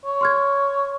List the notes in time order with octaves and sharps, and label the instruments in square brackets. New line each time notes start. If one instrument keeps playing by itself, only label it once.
[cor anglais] C#5
[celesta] C6 F6 G#6